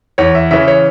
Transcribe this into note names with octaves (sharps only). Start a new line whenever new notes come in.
E2 C#5
E5
C#3 E3 C#4 E5
C#5